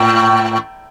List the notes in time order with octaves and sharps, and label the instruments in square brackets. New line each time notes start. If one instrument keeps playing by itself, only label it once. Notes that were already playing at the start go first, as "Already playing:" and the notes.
Already playing: [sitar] A2